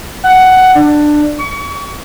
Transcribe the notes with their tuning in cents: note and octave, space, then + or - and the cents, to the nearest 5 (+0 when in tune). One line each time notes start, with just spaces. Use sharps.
F#5 +10
D4 +15
C#6 +35